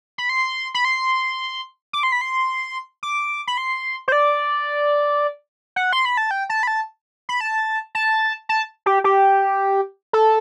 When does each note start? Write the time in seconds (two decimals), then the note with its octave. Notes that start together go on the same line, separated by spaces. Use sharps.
0.18 B5
0.29 C6
0.74 B5
0.85 C6
1.93 D6
2.03 C6
2.12 B5
2.21 C6
3.03 D6
3.47 B5
3.58 C6
4.08 C5
4.12 D5
5.76 F#5
5.93 C6
6.05 B5
6.17 A5
6.31 G5
6.50 A5
6.63 B5
6.67 A5
7.29 B5
7.41 A5
7.95 A5
8.49 A5
8.86 G4
9.04 G4
10.13 A4